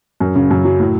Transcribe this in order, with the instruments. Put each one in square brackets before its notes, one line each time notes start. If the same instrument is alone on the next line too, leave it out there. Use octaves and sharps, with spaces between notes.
[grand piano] F#2
C#3
F#2
F#3
A2